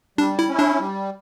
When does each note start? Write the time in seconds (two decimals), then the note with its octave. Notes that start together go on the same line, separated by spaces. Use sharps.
0.18 G3 D4
0.39 E4
0.49 C#4 E4
0.59 D4
0.80 G3